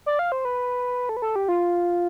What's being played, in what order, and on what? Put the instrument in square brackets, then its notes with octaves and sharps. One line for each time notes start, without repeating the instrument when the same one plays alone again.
[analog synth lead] D5
F5
C5
B4
A4
B4
A4
G4
F4